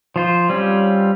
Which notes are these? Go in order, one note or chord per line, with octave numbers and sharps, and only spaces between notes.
F3 F4 C5
G3 C4 C#4 F4